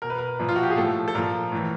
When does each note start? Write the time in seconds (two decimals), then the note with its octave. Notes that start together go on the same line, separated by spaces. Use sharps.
0.02 B2 A#4
0.10 B4
0.18 A#4
0.39 A#2 F3
0.49 F4
0.56 F#4
0.63 G4
0.70 G#4
0.77 A2 F3 A4
1.08 A4
1.15 A#2 F3 A#4
1.52 A2 E3